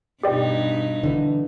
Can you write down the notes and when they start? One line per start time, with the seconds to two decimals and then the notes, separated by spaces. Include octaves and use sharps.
0.23 G2 B2 D#4 G4 D5 G5
1.03 D3 E3